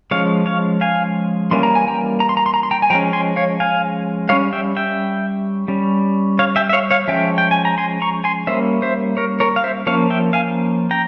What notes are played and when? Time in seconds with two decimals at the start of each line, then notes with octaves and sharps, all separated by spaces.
0.11 F3 G#3 C#4 C#5 F5
0.46 C#5 F5
0.81 F5 G#5
1.51 E3 G3 A#3 C#4 C6
1.63 A#5
1.75 G#5
1.88 G5 A#5
2.20 A#5
2.29 C6
2.37 A#5
2.46 C6
2.54 A#5
2.63 C6
2.71 G5 A#5
2.82 G#5
2.90 F3 G#3 C#4 G5 A#5
3.13 G#5 C6
3.36 C#5 F5
3.60 F5 G#5
4.29 G3 C#5 F5
4.33 C#4
4.53 E5 G5
4.76 E5 G5
5.68 G3 C#4
6.39 C#5 F5
6.56 E5 G5
6.69 E5
6.73 C#5 F5
6.91 C#5 F5
7.08 F3 G#3 C#4 E5 G5
7.38 G5
7.51 G#5
7.65 A#5
7.78 G#5 C6
8.02 A#5 C#6
8.24 G#5 C6
8.47 G3 A#3 C#4 C5 E5
8.82 C5 E5
9.17 A#4 C#5
9.40 A#4 C#5
9.56 F5
9.64 C5 E5
9.87 F3 A#3 C#4 C#5 F5
10.10 E5 G5
10.33 F5 G#5
10.91 G5 A#5